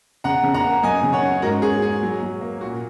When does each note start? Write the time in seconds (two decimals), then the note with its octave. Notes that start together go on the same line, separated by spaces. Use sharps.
0.24 C#3 F#5 A#5
0.44 C#3
0.54 F#5 A#5
0.64 A#3
0.83 F#2 D#5 G#5
1.03 C#3
1.13 C#5 F#5
1.23 C#4
1.42 G#2 F#4 A#4
1.62 C#4 G#4
1.82 C#4 G#4
2.03 F#3
2.23 F#3
2.41 A#3
2.61 A#2 F#4